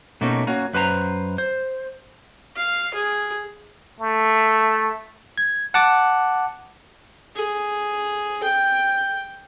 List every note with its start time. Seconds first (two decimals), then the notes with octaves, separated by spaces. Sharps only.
0.21 B2 A3 A#3 C#4 D#4
0.47 A#3 C#4 F#4
0.74 F#2 B4 C5 A5 A#5
1.38 C5
2.56 F5
2.94 G#4
4.00 A3
5.38 G#6
5.74 F#5 A5 D6
7.35 G#4
8.43 G5